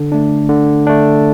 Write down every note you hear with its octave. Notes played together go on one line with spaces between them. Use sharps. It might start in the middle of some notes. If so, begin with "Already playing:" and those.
Already playing: D3
A3 D4
D3
A3 D4